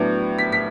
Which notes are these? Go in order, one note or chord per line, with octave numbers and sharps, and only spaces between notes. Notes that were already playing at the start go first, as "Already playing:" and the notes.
Already playing: A2 F#3 B3 D4
B6
B6